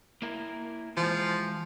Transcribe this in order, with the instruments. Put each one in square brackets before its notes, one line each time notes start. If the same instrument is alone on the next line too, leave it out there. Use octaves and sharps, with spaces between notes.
[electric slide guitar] A#3 E4 A#4
[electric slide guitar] E3 G#3 [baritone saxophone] F3